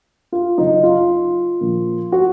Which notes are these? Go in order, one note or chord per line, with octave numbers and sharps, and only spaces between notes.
F4
F#2 C#3 F#3 D#4
F4
A#2 F3
F#4